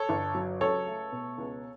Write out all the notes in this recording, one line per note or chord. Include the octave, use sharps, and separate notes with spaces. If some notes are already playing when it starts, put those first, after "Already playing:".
Already playing: A4 C#5
G1
F#3
C#2 A4 C#5
A3
B2
C#2